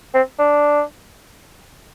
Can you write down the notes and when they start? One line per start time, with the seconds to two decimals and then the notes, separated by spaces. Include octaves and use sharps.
0.14 C4
0.39 D4